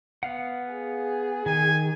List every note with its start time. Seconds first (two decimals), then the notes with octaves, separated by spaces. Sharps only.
0.23 B3 F5 F#5
0.73 G#4
1.46 D#3 G#5